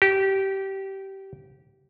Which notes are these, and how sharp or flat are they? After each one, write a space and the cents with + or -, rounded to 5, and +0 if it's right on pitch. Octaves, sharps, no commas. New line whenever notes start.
G4 -20